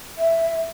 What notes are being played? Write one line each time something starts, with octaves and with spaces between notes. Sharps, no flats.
E5